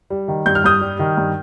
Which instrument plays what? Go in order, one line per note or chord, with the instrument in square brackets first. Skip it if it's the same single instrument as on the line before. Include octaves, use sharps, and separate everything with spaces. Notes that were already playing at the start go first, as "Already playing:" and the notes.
[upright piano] G3
D#3
G2 G6
F6
G2 D#6 G6
G3
D#3
G2